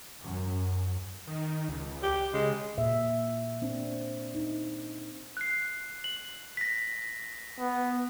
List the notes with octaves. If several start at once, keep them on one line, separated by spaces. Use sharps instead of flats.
F#2
D#3
C#2
G4
C#3 G#3
A#2 E5
C4 D4
D#4
F#6 C7
F#7
A#6 B6
B3